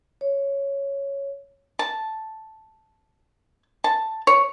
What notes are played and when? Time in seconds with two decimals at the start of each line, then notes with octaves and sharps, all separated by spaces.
0.21 C#5
1.79 A5
3.84 A5
4.27 C#5